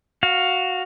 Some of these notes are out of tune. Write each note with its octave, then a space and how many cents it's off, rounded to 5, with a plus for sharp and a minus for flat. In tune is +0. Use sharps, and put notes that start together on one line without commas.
F#4 +0 F5 +10